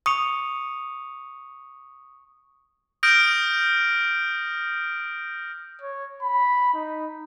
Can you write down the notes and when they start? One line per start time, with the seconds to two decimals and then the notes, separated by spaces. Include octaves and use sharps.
0.06 C#6 D#6 C#7 F7
3.03 D#6 F6 G6 A#6 D7
5.81 C#5
6.22 B5
6.74 D#4